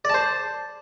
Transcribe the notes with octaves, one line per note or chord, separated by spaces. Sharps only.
C5 D5 A5